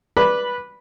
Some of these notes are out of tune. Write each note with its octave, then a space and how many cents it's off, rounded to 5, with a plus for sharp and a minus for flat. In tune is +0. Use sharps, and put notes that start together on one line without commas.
B4 -15 D5 +0 B5 -5